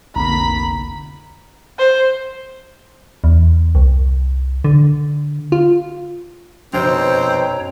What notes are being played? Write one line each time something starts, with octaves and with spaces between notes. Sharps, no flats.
F1 B1 D3 A#3 A#5 B5 B6
C5
E2
C2
D3
F4
F1 F#2 B2 C4 C5 C#5 A#5